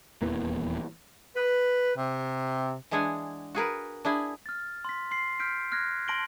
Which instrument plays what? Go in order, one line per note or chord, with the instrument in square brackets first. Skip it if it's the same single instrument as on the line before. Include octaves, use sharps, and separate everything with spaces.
[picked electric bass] D#1 E2 E3 A#3
[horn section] B4
C3
[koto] E3 G#3 D4 G#4 F#5 G#5
F#4 G#4 A#4 B4
D4 E4 G#4
[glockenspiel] F6 A6
C6 B6
C6 C7
F6 G6 B6 D7
F6 F#6 G#6 A#6
A5 C6 A#6 D7 F#7 G7